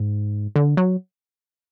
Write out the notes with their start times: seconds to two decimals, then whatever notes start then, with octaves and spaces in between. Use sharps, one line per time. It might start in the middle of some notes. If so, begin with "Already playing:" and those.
Already playing: G#2
0.56 D3
0.77 F#3